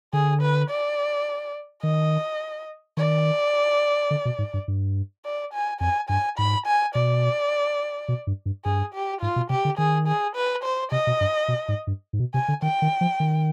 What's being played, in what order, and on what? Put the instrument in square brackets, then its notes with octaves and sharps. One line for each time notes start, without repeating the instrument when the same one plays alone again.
[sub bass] D3 [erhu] G#4
[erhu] B4
D5
[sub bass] D#3 [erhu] D#5
[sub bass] D#3 [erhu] D5
[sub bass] D3
B2
G#2
G2
G2
[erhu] D5
G#5
[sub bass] F2 [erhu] G#5
[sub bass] G2 [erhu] G#5
[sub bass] G#2 [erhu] B5
[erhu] G#5
[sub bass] B2 [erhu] D5
[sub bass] B2
G2
G2
[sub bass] G2 [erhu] G#4
[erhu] G4
[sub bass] G#2 [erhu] F4
[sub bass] B2
[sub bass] C3 [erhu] G4
[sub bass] D3
[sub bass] D#3 [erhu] G#4
[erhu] G#4
B4
C5
[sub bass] C3 [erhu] D#5
[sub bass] B2
G2
B2
G#2
G2
G#2
B2
[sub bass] C3 [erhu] G#5
[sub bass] D3
[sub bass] D#3 [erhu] G5
[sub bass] D#3
F3
D#3